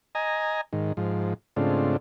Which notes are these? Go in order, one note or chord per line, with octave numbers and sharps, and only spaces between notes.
D#5 G#5 A#5
G#2 D#3
G#2 F3
G#2 C#3 A3 C4 D4 F4